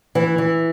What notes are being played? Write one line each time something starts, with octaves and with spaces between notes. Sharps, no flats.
E3
E3